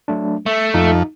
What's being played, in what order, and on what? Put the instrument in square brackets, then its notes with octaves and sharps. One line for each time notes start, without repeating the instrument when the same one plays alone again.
[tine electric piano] F#3 A3 D4
[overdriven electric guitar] A3 [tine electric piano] E5
[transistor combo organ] F2 [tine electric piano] D#4